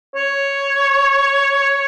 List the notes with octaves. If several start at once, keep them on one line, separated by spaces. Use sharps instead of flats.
C#5